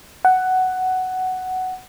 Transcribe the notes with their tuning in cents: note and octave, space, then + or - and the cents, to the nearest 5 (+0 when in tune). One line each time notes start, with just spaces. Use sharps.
F#5 +10